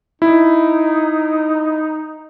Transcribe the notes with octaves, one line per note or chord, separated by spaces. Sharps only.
D#4 E4